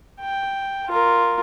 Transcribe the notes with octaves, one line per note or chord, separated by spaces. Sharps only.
G5
F4 A#4